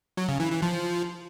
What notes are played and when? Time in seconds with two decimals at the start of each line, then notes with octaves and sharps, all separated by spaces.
0.17 F#3
0.29 C#3
0.40 E3
0.51 E3
0.62 F3